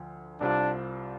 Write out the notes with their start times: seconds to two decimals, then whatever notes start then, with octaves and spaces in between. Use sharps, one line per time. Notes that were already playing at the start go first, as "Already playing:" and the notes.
Already playing: D2 D3 F3
0.40 C2 C3 G3 C4 D4 F4